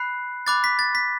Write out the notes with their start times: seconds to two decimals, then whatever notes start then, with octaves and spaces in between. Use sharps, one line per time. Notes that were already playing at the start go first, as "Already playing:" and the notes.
Already playing: B5 F#6 C7
0.47 B5 D6 F#6 A6
0.64 B6
0.79 A6
0.95 B6